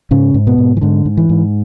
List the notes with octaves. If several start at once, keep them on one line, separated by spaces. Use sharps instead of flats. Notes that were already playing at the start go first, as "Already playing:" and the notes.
G#2 C#3 C#4
G#2
B2 B3
G#2
E3
G#2 D3
G#2
E3
G#2